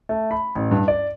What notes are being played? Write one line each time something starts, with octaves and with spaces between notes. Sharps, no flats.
A3
B5
A1
G2
D5